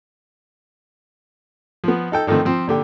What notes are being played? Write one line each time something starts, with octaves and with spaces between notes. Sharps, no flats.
F3 B3
D#4 A4 G5
D3 D#3 F3 A3 C4
F3 C4
A#2 D3 G4